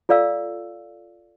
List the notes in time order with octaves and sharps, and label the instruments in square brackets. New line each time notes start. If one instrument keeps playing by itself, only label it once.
[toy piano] F4 A4 D5 F5 E6